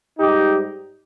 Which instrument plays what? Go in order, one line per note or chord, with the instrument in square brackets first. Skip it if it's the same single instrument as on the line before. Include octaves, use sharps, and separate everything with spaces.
[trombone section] G#2 G3 D#4 G4